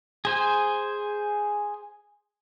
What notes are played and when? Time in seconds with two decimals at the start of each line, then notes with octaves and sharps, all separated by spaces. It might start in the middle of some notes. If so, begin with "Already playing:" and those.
0.25 G#4 C5 G#5